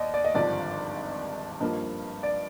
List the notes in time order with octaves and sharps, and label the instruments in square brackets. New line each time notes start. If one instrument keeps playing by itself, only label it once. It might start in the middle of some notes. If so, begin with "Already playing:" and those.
Already playing: [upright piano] D#2 D5 D#5
D5
D#5
G#1 G2 D3 F3 D5
G2 F3 A#3 D#5
D5